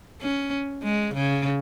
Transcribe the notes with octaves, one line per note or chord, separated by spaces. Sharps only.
C#4
G#3
C#3